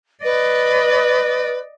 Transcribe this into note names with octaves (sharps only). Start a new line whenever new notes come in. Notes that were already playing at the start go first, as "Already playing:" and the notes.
B4 D5 D#5